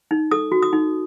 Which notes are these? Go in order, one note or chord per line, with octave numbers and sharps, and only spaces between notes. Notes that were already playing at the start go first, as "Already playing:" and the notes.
D#4
A4 D#6
F#4
D#6
D#4